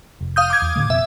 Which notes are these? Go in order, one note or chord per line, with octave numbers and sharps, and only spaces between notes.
F1
F5 D#6 G6
D6 G#6
E2
A2 D3 A3
F1 F2 B2 E5